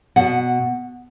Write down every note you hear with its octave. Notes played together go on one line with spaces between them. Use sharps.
B2 F#5